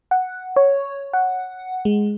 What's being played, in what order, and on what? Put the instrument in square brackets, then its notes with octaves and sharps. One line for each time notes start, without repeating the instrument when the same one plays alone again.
[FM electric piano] F#5
C#5
F#5
G#3